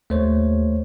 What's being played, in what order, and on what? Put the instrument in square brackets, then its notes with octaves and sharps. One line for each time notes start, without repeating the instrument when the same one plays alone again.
[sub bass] D#2 [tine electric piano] A3 C5 C#5